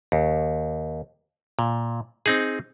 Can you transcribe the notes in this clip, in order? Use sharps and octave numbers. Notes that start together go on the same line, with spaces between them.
D#2
A#2
C4 D#4 G#4